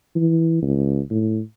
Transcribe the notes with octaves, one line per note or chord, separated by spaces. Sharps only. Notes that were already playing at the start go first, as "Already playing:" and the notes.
E3
C#2
A2